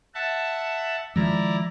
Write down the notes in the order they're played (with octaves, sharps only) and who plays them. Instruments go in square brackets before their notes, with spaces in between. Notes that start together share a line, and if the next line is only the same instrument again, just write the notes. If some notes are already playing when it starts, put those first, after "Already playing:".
[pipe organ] E5 F#5 A5
[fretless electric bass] D#3 F3 G#3 [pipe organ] E4 D5 A#5